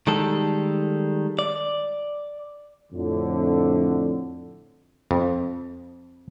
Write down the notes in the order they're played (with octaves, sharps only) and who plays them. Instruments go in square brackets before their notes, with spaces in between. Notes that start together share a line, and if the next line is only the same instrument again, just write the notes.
[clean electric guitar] D#3 G3 G#3 A4
D5
[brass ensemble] F2 A2 D3
[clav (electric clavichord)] F2